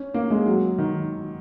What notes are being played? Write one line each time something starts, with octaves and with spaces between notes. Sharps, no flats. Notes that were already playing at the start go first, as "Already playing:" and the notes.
Already playing: C#4
A#3
G#3
F#3
D#3